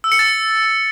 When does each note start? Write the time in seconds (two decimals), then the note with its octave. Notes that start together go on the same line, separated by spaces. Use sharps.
0.04 E6
0.12 C#7
0.19 A6